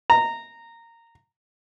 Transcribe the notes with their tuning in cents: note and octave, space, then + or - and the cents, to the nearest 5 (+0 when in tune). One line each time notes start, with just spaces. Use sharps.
A#5 -15